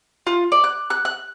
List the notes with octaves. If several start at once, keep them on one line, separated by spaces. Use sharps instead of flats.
F4
D5
F#6
F#6
F#6